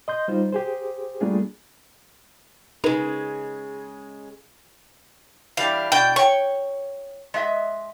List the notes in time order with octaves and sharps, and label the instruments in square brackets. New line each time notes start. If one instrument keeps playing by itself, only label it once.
[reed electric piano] D#5 C6 G6
G3 D#4 F4 C5
G4 G#4 C5
G3 A3 A#3 D4 F4 G#4
[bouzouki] C#3 G#3 [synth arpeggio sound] D#4 A#4 B4
[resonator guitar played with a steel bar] E3 G3 D4 [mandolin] F5
[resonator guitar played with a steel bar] B2 D4 [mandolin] G5
[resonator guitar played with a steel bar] C#5 G5 [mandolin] C#6
[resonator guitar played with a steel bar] G#3 D#5 E5